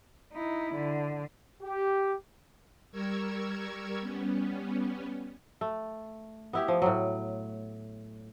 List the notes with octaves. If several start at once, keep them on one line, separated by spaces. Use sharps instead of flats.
D#4 E4
D3
G4
G3 A#4 C#6 E6 G#6
G3 B3 C#4
A3
B3 E4 G4
F3
A2 F#3